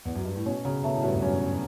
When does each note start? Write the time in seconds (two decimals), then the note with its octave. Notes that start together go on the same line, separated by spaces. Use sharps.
0.05 E2
0.15 F#2
0.25 G2
0.36 A2
0.46 B2 C#4
0.65 C#3 F#3
0.84 B2 A3
0.94 A2
1.03 G2 F#3
1.14 E2
1.22 F#2 C#4
1.41 F#3